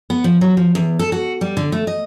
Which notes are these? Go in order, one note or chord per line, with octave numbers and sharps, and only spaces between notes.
B3
F3
F#3
F3
E2
A4
F#4
G3
D3
A3
D#5